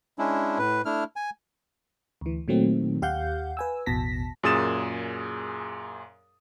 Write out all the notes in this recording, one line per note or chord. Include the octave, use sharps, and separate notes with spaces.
G#3 C#4 D4 E4
A2 B4
A3 D4 E4 F6
G#5
D2 E3
A#2 D#3 F#3 A3 C4
D#2 G4 F5 F#5 G6
B4 G#5 E6
A1 E2 B2 A5 A#6 B6
F#2 A#2 G#4 D#6 A6 E7